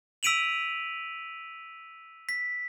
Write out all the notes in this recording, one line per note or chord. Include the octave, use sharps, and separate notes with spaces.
E6 B6 D7 D#7 F7 F#7
B6